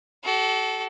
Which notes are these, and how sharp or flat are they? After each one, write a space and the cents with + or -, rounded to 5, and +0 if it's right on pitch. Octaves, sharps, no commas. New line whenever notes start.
F#4 +40 A4 -20